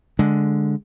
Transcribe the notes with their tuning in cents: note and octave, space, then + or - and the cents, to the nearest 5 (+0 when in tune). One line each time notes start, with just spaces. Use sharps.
D3 +0 G#3 +0